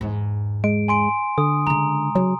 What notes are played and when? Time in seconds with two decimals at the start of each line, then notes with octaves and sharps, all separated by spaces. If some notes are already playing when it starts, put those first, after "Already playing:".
0.01 E2 G#2
0.64 G#3 D7
0.88 G#5 C6 D7
1.38 D3 D#6
1.67 C#3 G#3 A#5
2.15 C#3 F#3